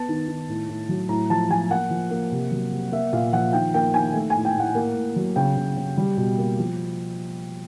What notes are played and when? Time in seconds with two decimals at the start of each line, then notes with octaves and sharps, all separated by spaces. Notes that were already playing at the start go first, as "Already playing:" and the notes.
Already playing: B3 A5
0.08 D#3
0.28 D#3
0.49 A2
0.69 A2
0.89 F#3
1.09 A2 A#5
1.30 F3 A5
1.50 F3 G#5
1.70 A#3 F#5
1.90 F3
2.11 A#3
2.32 C3
2.51 F#3
2.72 C3
2.92 A#3 E5
3.12 A#2 F5
3.32 F3 F#5
3.53 D#3 G5
3.74 A#3 G5
3.94 D#3 G#5
4.14 A3
4.30 A2 G#5
4.45 G5
4.56 A2 F#5
4.75 A#3
4.95 A2
5.16 F#3
5.36 C#3 G5
5.56 C#3
5.77 C#3
5.98 G3
6.17 B2
6.38 A#3
6.59 F3